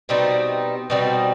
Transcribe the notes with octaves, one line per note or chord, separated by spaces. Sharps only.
B2 G3 C4 D#4
B2 G3 C4 D#4